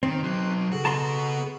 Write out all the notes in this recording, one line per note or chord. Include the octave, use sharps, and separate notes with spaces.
D#3 C4
F#3 D#4 C6 F#6 C7
C#3 F#4 G#4 A4
B3 F#4 A5 A#5 C6